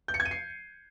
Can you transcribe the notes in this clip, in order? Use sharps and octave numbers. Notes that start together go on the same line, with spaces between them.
G6
C#7
G#6
D#7
C7